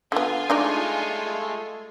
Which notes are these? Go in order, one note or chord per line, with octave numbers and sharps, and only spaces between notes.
D3 B3 F4 G#5
G#3 A3 D4 D#4 D5